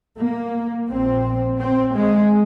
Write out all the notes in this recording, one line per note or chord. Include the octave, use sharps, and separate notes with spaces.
A#3
A#1 A#2 C4
C4
G#3